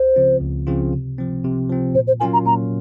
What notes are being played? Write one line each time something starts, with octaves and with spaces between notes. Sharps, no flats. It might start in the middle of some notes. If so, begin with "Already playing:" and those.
Already playing: C#2 C5
C#3 F3 C4 F4
C#2
C#3 F3 C4 F4
C3
F3 C4
C3
F3 C4
A#2 C5
C5
F#3 C#4 F4 A#4 G#5
A#5
A#2 A#5